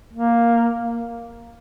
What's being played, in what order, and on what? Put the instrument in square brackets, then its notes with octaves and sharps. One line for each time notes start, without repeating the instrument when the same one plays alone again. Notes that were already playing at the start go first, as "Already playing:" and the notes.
[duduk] A#3